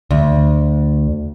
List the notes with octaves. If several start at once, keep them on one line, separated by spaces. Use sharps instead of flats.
D2